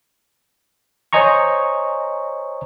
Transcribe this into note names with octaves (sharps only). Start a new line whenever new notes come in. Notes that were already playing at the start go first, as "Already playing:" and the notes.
C5 C#5 D#5 G#5 A#5 C#6